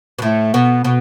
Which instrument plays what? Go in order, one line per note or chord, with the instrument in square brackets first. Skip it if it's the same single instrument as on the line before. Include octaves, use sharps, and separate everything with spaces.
[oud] B2
[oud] A2 [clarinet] A3
[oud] B2 [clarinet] B3
[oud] B2 [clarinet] B3